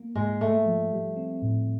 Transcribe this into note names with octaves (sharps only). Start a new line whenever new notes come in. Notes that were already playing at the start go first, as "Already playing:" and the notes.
Already playing: A#3
G#2 G#3
G#2 A3
F3
G3
C4
A2